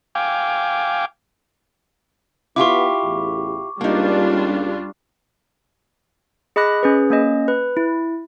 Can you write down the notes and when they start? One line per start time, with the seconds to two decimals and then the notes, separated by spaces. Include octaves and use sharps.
0.15 F5 G5 G#5 D6
2.56 B3 E4 F4 G4 C#6 D6
3.03 A1 E2
3.81 C#2 G3 A#3 D4 D#4 F4
6.56 G#4 D#5 B5 D6 F#6 A#6
6.83 C#4 G#4 B4
7.10 A#3 C#4 D#5
7.48 B4
7.77 E4